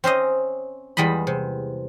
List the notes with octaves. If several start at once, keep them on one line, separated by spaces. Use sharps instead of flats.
C4 C#4 C5 D#5
E2 G3 G#3 D#5 B5
C3